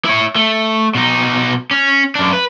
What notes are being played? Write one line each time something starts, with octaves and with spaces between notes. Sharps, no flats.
E4 C#5
A3
B2 D#4
C#4
F#2 D4
B4